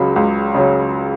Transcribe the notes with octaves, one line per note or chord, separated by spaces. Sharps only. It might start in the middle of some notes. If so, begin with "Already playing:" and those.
Already playing: C#2 C#3 F#3 B5
C#2
C#3 F#3